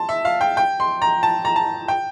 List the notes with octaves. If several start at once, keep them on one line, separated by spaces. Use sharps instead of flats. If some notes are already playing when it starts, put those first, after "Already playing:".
Already playing: A5 C6
E5
F5
G5
G5
C6
A#5
A5
A#5
A5
G5